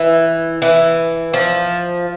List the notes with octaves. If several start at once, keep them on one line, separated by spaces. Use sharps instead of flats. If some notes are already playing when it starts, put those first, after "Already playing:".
Already playing: E3
E3
F3